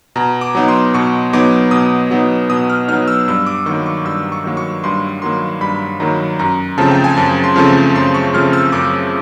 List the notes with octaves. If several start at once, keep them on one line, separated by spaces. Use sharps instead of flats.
B2 A#5
D6
F#3 B3 D#4
C6
B2 C#6
F#3 B3 D#4 D6
B2 D#6
F#3 B3 D#4
B2 D#6
F6
F#3 B3 D#4 F6
E6
G2 E6
D6
D#3 F#3 A#3 C#6
C#6
G2 E6
C#6
D#3 F#3 A#3
C#6
G2 C6
D#3 F#3 A#3 C6
G2 B5
D#3 F#3 A#3 A#5
F#2 A#5
C#3 F3 A3 C4 A5
G5
G#5
F#2 A5
C6
C#3 F3 A3 C4
F#2 C6
C#6
C#3 F3 A3 C4 F6
E6
F#2 D6